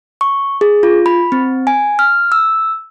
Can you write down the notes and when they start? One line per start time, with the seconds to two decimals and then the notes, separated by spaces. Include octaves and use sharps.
0.21 C#6
0.61 G#4
0.83 F4
1.06 B5
1.32 C4
1.67 G#5
1.99 F6
2.32 E6